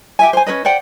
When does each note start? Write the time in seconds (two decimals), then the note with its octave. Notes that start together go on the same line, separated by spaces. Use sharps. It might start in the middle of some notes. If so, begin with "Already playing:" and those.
0.19 G4 E5 G#5
0.33 C5 G#5
0.46 C#4 A#4 B4 D#5
0.65 C5 D5 F#5 G5